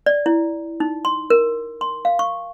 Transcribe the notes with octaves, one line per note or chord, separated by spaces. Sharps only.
D5
E4
D#4
C6
A#4
C6
F5
C#6